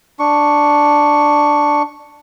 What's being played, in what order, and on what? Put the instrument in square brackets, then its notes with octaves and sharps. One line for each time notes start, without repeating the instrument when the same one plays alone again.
[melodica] D4 C#6